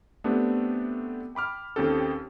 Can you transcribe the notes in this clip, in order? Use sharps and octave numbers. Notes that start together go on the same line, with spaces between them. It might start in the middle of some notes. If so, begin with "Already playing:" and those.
A3 B3 C4 D4 G4
G5 B5 D6 F6
D#2 C4 C#4 G4 A4